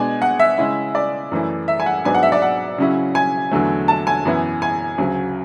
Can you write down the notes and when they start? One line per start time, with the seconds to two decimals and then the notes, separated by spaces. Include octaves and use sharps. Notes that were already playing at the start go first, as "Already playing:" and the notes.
Already playing: B2 G#3 D4 G#5
0.22 F#5
0.40 E5
0.58 C#3 G#3 C#4 E4
0.95 D5
1.32 F#2 E3 A3 E4
1.68 E5
1.80 G#5
1.86 F#5
2.05 G#2 F#3 B3 D4 G#5
2.15 F#5
2.23 E5
2.32 D5
2.42 F#5
2.78 C#3 F#3 C#4 E4
3.15 G#5
3.51 E2 D3 F#3 A3
3.88 A5
4.07 G#5
4.25 F#2 E3 B3 E4
4.62 G#5
4.98 D2 C#3 F#3